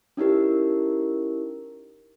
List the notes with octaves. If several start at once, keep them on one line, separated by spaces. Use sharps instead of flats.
C#4 D#4 E4 G4 A#4